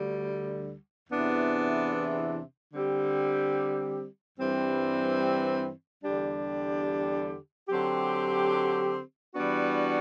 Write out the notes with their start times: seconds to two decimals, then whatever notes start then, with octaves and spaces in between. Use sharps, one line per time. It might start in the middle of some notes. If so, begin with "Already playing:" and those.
Already playing: D2 D3 G3
1.08 E2 C3 E3 B3 D4
2.74 D3 G3 C4 G4
4.39 G2 E3 G3 C4
6.03 E2 D3 G3 D4 G4
7.69 D3 F#3 C4 G4
9.34 E3 G3 B3 D4 F#4